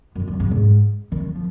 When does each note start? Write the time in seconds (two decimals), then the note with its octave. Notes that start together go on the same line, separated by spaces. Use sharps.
0.15 F#2
0.28 F#2
0.40 G#2
0.51 G#2
1.12 D#3
1.36 F3